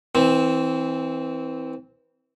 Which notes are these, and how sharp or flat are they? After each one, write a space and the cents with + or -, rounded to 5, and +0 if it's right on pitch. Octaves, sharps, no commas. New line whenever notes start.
E3 -25 C4 +0